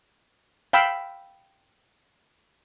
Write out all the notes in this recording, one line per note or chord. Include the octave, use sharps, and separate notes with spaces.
F5 G5 B5 E6